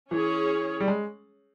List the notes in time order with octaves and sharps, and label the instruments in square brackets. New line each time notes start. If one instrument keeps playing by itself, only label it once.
[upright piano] E3 [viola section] C#4 G#4 C#5
[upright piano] G3
G#3